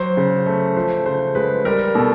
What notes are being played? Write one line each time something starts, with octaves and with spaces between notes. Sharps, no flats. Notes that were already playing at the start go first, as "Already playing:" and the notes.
Already playing: F#3 C5
C#3
A3
F3 C5
C#3 C5
G#3 B4
G3 A#4
B2 A4